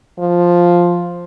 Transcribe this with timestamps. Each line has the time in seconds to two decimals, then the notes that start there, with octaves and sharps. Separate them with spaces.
0.19 F3